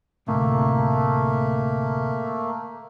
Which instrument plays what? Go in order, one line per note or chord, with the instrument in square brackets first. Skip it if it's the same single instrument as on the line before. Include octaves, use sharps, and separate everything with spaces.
[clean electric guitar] D2 A2 C3 [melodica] A3 A#3